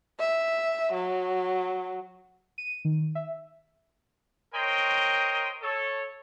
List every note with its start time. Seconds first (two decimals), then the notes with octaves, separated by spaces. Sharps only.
0.19 E5
0.93 F#3
2.58 D#7
2.85 D#3
3.15 E5
4.55 A#4 C5 C#5 D#5 G5 C6
5.62 A4 C#5